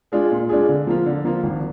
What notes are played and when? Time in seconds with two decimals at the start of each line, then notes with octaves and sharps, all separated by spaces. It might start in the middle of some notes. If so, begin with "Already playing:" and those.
0.12 G#3 D4 F4 G#4
0.31 A#2
0.49 G#3 D4 F4 G#4
0.69 D3
0.87 F3 A#3 F4
1.06 D3
1.25 F3 A#3 F4
1.43 G#1